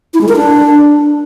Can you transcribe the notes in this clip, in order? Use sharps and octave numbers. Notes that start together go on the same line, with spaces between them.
E4
G#3
A#4
D4